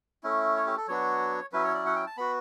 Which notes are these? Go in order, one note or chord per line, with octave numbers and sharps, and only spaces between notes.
A3 C#4 E4
C#5
G4
A4
F#3 B3 D4 F#4 C#5
F#3 C#4 E4 B4
C#5
D5
F#5
G5
A5
B3 F#4 B5